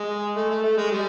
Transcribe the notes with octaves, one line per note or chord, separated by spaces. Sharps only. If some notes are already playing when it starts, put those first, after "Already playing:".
Already playing: G#3
A3
A3
A3
G#3
G3